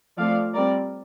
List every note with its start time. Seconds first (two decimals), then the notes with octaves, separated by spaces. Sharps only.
0.17 F3 A3 C4 D5 F5
0.54 G3 C4 A#4 D5